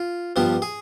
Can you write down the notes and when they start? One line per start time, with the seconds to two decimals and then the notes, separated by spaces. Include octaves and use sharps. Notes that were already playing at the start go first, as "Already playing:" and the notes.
Already playing: F4
0.36 G2 F3 B3 G4
0.62 G#4